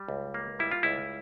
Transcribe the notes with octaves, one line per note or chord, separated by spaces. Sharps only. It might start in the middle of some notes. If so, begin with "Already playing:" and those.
Already playing: G3
C#2
A#3
G3 E4
F4
C#2 E4